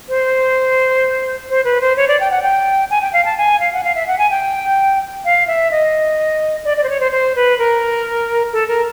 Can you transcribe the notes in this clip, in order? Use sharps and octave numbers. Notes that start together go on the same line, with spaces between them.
C5
C5
B4
C5
C#5
D5
G5
F#5
G5
G#5
G5
F5
A5
G#5
F5
F#5
F5
E5
F#5
G#5
G5
F5
E5
D#5
D5
D5
C5
C#5
C5
C5
B4
A#4
A4
A#4